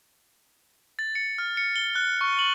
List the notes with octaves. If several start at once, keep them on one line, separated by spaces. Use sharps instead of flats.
A6
C#7
F6
C#7
G7
F#6
C#6
F#7